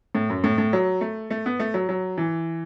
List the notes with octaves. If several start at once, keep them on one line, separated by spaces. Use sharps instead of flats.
A2
F#2
A2
A2
F#3
A3
A3
B3
A3
F#3
F#3
E3